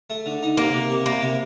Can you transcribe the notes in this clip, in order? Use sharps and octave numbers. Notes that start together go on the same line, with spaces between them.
A3
D3
D#4
C3 A#3
C3
C3
G3 A#3
C3